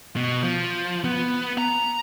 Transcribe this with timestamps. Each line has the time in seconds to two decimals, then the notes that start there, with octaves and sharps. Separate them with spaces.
0.16 B2
0.43 F3
1.05 B3
1.58 A#5